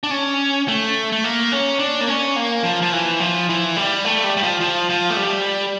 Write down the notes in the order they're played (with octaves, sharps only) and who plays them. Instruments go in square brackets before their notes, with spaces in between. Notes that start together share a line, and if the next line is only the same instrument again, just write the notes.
[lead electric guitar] D4
C#4
A3
A3
A#3
C#4
D4
A#3
C#4
A#3
F3
F3
E3
F3
E3
G3
A3
G3
G3
F3
F3
F3
A3
G3